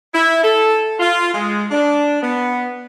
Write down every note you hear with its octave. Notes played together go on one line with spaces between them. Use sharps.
E4
A4
F4
G#3
D4
B3